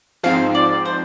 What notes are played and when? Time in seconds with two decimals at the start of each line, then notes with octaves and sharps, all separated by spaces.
0.23 G#2 F3 C4 F5
0.55 D5
0.85 C5